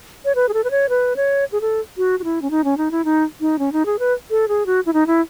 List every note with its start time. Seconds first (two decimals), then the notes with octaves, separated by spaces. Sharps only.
0.25 C#5
0.35 B4
0.49 G#4
0.54 A4
0.64 B4
0.71 C#5
0.89 B4
1.16 C#5
1.52 G#4
1.61 A4
1.97 F#4
2.19 F#4
2.24 E4
2.42 C#4
2.51 D#4
2.64 C#4
2.77 D#4
2.91 E4
3.05 D#4
3.41 D#4
3.59 C#4
3.73 D#4
3.86 G#4
3.99 B4
4.30 A4
4.48 G#4
4.66 F#4
4.86 E4
4.94 D#4
5.07 E4